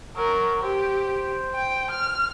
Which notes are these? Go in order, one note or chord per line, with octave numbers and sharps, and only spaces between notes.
F#3 A#4
G4 C5
G5
F6